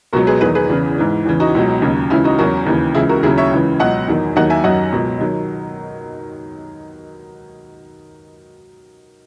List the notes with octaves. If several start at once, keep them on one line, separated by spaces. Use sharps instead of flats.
C#2 B2 F#3 F#4 A#4
G#4 B4
E2 D#3 F#3 G#4 B4
G#4 B4
E2 C#3 E3
G#2 E3
E2 C#3 E3
D#4 F#4
C#2 B2 F#3
D#2 C#3 F#3
C#2 C#3 E3 C#4 E4
D#4 F#4
E2 C#3 F#3 F#4 A#4
D#2 C#3 E3
C#2 C#3 E3 E4 G#4
F#4 A#4
D#2 C#3 F#3 E4 G#4
C#5 E5
C#2 C#3 E3
C#2 B2 F#3 D#5 F#5
E2 D#3 F#3
D#2 D#3 F#3 D#5 F#5
E5 G#5
F#2 D#3 F#3 D#5 F#5
C#2 B2 F#3
D#3 F#3